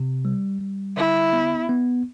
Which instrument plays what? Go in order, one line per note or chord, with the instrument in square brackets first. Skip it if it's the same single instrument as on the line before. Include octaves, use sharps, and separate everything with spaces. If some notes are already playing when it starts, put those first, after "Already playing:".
Already playing: [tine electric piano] C3
G3
G3
[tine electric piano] D3 [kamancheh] E4
[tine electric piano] B3
B3